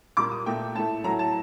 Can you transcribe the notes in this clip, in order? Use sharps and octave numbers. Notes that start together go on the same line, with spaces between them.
A#2 G3 A#3 D6
D#6
A#2 A3 G5
A2 A3 A5
A2 F#3 A3 A#5
A5